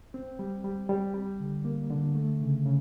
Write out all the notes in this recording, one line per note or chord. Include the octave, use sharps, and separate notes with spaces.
C4
G3
G3
G3
G3
D3
A#3
D3
A3
C#3
C#3